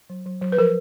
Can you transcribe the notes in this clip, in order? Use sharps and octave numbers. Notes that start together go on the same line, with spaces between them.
F#3
F#3
F#3
B4
F3 A#4